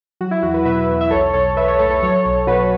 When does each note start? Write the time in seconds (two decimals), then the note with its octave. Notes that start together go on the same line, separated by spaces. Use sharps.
0.21 F#3 F#4
0.31 E4
0.42 E2 F#4
0.54 F#4 B4
0.65 B2 B4 E5
0.89 E2
1.01 E5
1.11 B1 A4 C#5
1.33 B1 A4 C#5
1.57 B1 B4 E5
1.68 A4 C#5
1.79 A2 A4 C#5
1.90 A4 C#5
2.02 F#3 A4 C#5
2.25 B1
2.47 B2 F#4 B4